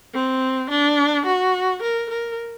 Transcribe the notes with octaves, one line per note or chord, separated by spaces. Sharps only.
C4
D4
F#4
A#4
A#4